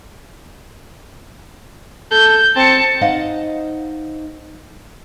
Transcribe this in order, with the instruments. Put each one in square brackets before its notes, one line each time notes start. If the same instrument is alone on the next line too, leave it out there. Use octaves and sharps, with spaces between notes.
[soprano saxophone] A4 [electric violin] G6
[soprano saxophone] C4 [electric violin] A5 C#7
[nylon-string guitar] D#4 C5 D#5 F5 F#5